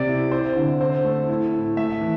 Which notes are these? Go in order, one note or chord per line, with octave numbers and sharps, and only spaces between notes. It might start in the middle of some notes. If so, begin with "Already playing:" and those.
Already playing: C3 C4 D5
E4
E4 C5
D3
C4 C5
A3
E4
A2
A3 E5
E3